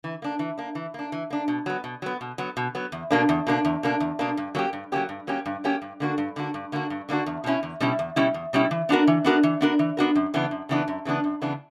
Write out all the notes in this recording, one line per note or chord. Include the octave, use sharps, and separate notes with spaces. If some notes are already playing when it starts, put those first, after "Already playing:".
E3
A#3 D4
E3
A#3 D4
E3
A#3 D4
E3
A#3 D4
B2
F#3 B3
B2
F#3 B3
B2
F#3 B3
B2
F#3 B3
E2
B2 A#3 D4
E2
B2 A#3 D4
E2
B2 A#3 D4
E2
B2 A#3 D4
G2
F#3 A#3 C#4 G4
G2
F#3 A#3 C#4 G4
G2
F#3 A#3 C#4 G4
G2
F#3 A#3 C#4 G4
G2
D3 A#3 D4 F#4
G2
D3 A#3 D4 F#4
G2
D3 A#3 D4 F#4
G2
D3 A#3 D4 F#4
E2
B2 G3 C#4 E4
E2
B2 G3 C#4 E4
E2
B2 G3 C#4 E4
E2
B2 G3 C#4 E4
E3
B3 D4 F#4 A#4
E3
B3 D4 F#4 A#4
E3
B3 D4 F#4 A#4
E3
B3 D4 F#4 A#4
F#2
C#3 E3 B3 D4
F#2
C#3 E3 B3 D4
F#2
C#3 E3 B3 D4
F#2
C#3 E3 B3 D4